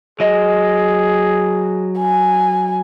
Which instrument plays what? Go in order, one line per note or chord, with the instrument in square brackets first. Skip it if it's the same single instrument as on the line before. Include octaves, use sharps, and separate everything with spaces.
[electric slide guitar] F#3 D#5 [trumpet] G#4
[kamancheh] G#5